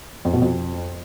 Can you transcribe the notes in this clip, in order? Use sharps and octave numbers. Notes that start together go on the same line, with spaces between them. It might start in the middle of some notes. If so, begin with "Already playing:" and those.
F2
B2
F2